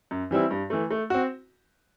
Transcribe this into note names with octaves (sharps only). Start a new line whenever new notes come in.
F#2
E3 G3 C4 E4
G2
E3 A3
A3
C4 F#4